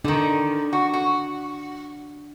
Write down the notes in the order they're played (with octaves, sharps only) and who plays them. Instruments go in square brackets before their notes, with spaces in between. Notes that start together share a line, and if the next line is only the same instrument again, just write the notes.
[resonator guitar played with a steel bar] D3 D#3 [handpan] D4
[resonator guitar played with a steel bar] F#4
F#4